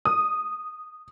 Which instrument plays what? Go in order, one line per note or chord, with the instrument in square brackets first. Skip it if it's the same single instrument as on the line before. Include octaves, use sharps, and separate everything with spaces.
[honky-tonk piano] D#6